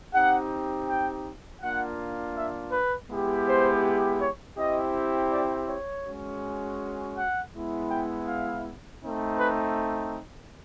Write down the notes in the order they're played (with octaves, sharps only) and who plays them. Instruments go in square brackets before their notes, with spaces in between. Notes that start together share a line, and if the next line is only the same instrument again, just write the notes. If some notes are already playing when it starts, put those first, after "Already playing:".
[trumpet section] C4 D#4 G4 F#5
G5
A#3 D4 F4 F#5
E5
B4
G#3 B3 E4 G4
C5
C#5
C4 E4 G4 D#5
D5
C#5
G#3 C#4 F#4
F#5
G#3 B3 E4
G5
F5
A3 C4 D#4
B4